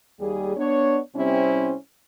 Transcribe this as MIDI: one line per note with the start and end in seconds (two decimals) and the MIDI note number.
0.20 0.53 39
0.20 0.53 55
0.20 0.53 68
0.57 0.99 59
0.57 0.99 62
0.57 0.99 73
1.15 1.73 48
1.15 1.73 55
1.15 1.73 60
1.15 1.73 61
1.15 1.73 64
1.15 1.73 72